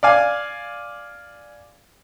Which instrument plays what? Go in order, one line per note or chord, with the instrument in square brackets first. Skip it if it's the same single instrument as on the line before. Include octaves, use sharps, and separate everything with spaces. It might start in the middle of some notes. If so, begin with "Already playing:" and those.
[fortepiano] D5 F5 G#5